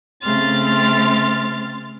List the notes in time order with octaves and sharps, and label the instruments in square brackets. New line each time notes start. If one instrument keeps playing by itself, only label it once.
[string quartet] C#3 A3 C4 C6 F6 A6